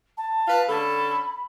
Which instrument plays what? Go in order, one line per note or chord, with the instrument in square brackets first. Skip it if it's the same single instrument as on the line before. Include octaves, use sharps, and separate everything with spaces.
[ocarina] A5
[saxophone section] B4 F5
[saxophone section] D3 C#4 A4 [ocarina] B5